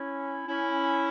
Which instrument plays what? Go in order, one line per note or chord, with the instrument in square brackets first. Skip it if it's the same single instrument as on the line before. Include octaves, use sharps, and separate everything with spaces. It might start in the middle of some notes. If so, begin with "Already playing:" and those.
Already playing: [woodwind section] C#4 E4
C#4 E4